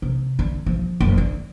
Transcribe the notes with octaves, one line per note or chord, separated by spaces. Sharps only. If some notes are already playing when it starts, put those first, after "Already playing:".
C3
D3
F3
F#1
D3